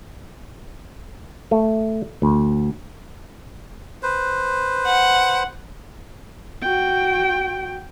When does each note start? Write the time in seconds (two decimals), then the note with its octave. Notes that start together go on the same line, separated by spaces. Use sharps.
1.51 A3
2.22 D2
4.03 B4 C5
4.86 F#5
6.62 F#4 G5